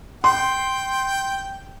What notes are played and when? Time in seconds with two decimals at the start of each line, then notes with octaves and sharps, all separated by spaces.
0.24 G5 C6